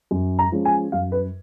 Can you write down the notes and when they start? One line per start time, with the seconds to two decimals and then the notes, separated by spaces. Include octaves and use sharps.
0.11 F#2
0.39 A#5
0.52 F3 G#3 C#4
0.65 G#5
0.92 F#2 F5
1.12 B4